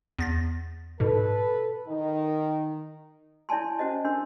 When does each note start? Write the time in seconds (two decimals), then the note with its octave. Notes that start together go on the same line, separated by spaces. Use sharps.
0.19 E2 A6 A#6
1.00 G#2 B2 A4 B4
1.87 D#3 D#4
3.49 E4 C#5 D5 G#5 A5 C6
3.78 C#4 F#4 C5 D#5 A5
4.05 D4 A#4 C6